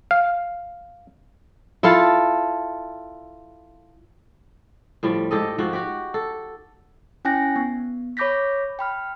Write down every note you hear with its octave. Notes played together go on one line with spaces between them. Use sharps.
F5
E4 F4 A4 F5
A2 F3 G3
G#2 G4 A4 D#5
G#2 F3 F#4 G4
F#4 G4
A4
C#4 E4 G5 G#5 F#6 A#6
B3
C#5 B5 D6 G6 A#6 B6
G5 B5 F6